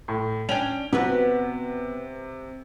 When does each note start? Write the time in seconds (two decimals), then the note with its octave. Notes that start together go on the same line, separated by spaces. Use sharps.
0.08 A2
0.49 C#4 D4 G5 F7
0.93 C3 B3 F#4 B4